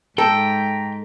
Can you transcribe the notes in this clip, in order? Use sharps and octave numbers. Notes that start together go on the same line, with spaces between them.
G#2 A4 G5 A#5